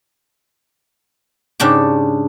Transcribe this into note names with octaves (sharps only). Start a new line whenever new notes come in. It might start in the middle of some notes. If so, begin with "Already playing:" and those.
G#2 C#3 D4 G4